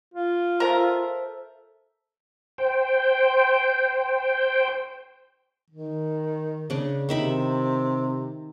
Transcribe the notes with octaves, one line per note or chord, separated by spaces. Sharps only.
F4
A4 A#4 C5 E5
C5 G5
D#3
C#3 D4
C3 D#3 E5 B5